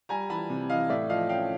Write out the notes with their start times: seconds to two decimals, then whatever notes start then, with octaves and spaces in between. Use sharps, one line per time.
0.09 G3 G#5 A#5
0.30 E3 A5 B5
0.50 C3
0.70 E3 D#5 F5
0.89 A2 D5 E5
1.09 F3 D#5 F5
1.29 C#4 F5 G5